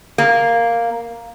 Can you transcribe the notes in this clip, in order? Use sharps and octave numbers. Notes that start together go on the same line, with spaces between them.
A#3